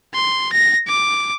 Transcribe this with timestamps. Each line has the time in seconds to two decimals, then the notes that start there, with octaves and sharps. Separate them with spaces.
0.14 C6
0.53 A#6
0.88 D6